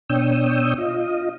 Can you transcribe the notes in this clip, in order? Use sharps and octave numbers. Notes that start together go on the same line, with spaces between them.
B2 D4 C#5 G5 D#6 E6
F4 D#5